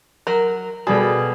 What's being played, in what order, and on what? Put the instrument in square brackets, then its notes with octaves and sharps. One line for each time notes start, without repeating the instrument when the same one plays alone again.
[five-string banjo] F#3 A#4
[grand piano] B2 G3 G#4 [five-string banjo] A4